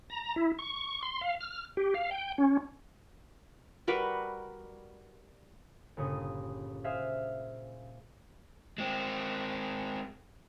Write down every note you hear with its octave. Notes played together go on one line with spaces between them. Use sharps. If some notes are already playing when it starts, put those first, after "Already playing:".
A#5
E4
C#6
C6
F5
F6
G4
F5
G5
C#4
G3 F#4 A#4 B4
G1 A#2 C#3 D#6
G#4 C5 E5 F5
G#3 C4